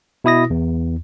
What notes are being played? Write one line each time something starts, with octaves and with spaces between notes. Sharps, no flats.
B2 E4 D#6 A#6
E2